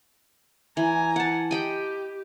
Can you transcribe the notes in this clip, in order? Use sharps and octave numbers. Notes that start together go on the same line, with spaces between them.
E3 G#5 A#5
F#5 A5
G4 D#5 G5 B5